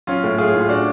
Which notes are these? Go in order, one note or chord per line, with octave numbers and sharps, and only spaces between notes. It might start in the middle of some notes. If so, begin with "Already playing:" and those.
F#3 C#4 F4
A2
A2 F4 G#4
A2
F4
D4 F#4